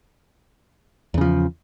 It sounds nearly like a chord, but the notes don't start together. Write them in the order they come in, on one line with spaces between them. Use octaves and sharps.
E2 C#3 F3